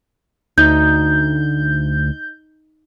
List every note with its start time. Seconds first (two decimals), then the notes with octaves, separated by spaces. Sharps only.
0.58 D2 D#4 G6